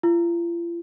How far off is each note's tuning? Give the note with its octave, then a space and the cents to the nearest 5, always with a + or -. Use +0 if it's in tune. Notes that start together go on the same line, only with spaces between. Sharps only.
F4 -45